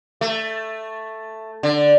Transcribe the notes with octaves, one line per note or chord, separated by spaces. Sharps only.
A3
D3